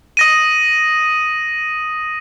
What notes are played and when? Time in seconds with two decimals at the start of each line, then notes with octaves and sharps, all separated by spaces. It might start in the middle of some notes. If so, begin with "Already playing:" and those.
0.17 D#6 A#6 D#7